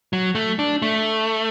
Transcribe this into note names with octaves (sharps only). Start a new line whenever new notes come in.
F#3
A3
D4
A3